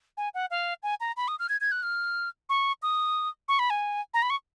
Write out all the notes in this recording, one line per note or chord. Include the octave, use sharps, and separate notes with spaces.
G#5
F#5
F5
G#5
A#5
B5
D#6
F6
G#6
G#6
F#6
F6
C#6
D#6
C#6
B5
G#5
A#5
B5
C#6